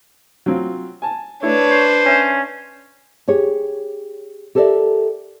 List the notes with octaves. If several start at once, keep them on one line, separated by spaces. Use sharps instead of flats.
F#3 C4 F4
G#5 A5
A3 D4 E4 B4 C#5
C5
C#4 C#5 E5
G4 G#4 C#5
G4 A4 A#4 C5 D5 E5